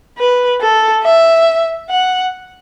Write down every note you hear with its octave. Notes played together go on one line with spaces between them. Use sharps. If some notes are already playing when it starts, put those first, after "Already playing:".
B4
A4
E5
F#5